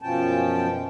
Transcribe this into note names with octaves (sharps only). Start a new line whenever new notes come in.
F#2 B2 F3 C#4 G5 A5